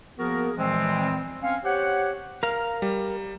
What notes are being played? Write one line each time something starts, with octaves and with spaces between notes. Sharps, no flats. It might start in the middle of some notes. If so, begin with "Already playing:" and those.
F3 A#3 B3 F#4 G#4 A#4
A#2 E3 F3 G3 G#3 C4
C4 C#4 F5
G4 C5 C#5 F#5
A#4 F5
G3